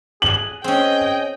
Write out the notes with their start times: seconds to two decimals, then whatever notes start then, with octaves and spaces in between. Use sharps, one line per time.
0.22 G#4 F#7
0.64 C4 C#4 G#4 D#5 G5